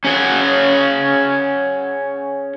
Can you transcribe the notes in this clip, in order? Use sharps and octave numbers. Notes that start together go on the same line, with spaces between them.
C#4 G#4 C#5 F#5